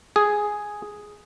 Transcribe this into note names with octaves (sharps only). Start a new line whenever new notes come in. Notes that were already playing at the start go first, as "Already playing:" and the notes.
G#4